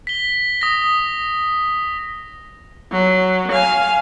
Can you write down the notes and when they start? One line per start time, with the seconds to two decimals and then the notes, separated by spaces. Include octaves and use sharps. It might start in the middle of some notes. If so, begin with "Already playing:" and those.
0.07 B6 G7
0.61 D#6 A#6
2.91 F#3
3.51 F5 G#5